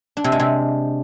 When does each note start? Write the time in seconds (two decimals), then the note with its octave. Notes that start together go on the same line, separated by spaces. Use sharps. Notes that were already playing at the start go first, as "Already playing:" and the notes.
0.17 D4
0.24 C3
0.32 G#3
0.40 C3